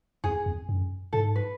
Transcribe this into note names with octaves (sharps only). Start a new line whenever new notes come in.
E2 G#4
E2
F#2
G#2 A4
B4